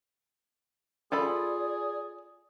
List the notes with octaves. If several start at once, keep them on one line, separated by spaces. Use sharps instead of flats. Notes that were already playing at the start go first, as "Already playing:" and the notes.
F4 G#4 A4 D5 B5